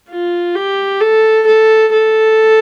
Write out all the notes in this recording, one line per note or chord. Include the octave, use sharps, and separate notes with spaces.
F4
G4
A4
A4
A4